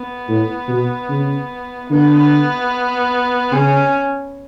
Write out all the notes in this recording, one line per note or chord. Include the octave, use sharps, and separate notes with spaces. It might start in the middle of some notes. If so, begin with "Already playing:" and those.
Already playing: B3
A2
B2
C#3
D3 B3
C#3 C#4